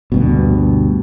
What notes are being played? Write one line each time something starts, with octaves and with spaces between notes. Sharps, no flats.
D2 G2 B2